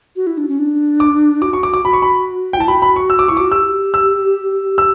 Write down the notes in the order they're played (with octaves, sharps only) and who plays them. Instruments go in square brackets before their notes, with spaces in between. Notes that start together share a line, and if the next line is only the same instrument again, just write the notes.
[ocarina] F#4
E4
D4
C#4
D4
[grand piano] D6
[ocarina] F#4 [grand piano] D6
[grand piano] C#6
D6
D6
[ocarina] F#4 [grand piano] B5
[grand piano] C#6
B5
G5
[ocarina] E4 [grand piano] A5
[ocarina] F#4 [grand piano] B5
[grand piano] B5
C#6
E6
D6
[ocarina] E4 [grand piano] C#6
[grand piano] D6
[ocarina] F#4
[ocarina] G4 [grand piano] E6
[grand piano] E6
E6